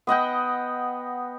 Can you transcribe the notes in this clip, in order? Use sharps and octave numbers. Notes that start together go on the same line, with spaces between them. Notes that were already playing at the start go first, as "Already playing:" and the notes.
B3 D#5 F#5 G5